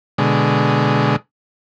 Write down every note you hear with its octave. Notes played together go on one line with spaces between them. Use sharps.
B2 D3 G#3